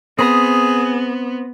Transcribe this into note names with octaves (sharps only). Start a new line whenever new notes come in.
B3 C4 G#4 B5 D#6